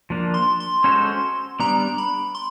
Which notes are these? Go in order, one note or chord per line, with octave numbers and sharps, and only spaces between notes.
F3 A#3 D4
C6
C6
G#3 C#4 F#4 A4 C5
G3 B3 D4 A#5
B5
C6